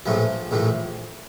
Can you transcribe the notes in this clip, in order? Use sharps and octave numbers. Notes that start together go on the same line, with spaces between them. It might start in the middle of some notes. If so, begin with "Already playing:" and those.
A#1 A2 E3 F3
A#1 A2 E3